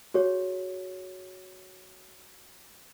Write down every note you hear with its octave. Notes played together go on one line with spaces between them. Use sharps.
F#4 G#4 C#5